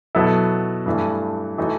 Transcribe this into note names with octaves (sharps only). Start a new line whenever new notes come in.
B2 F#3 B3 E4 A4
G2 E3 A3
E3 A3 D#4 F#4